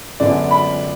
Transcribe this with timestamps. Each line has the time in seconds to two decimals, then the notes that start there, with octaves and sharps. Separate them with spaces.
0.20 F#2 D3 G#3 B3 D4 D5
0.51 B5